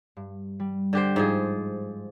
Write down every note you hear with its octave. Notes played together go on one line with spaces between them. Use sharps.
G2
G3
D3 G4 C5
G#2 F3 G#4